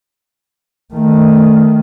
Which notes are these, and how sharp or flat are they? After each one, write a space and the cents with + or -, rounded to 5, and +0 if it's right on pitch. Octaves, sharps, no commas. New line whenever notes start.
D#3 +5 A3 +0